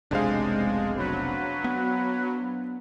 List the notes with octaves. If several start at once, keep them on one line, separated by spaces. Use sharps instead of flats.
F1 B1 C3 G#3 D4 C5 F5
F#3 B4
B3